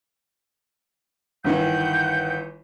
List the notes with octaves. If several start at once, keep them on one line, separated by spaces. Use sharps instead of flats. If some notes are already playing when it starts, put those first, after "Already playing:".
G1 D#3 E3 F#5 G5 G6